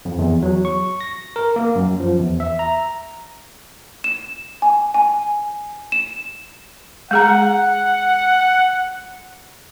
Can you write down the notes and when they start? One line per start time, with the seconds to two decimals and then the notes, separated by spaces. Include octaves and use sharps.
0.05 F2
0.19 E2
0.43 F#3
0.65 C#6
1.01 A#6
1.36 A#4
1.56 A#3
1.76 F#2
2.00 F3
2.19 E2
2.40 E5
2.59 A#5
4.04 E7
4.62 G#5
4.94 G#5
5.92 E7
7.11 G#3 G#4 F#5 A#5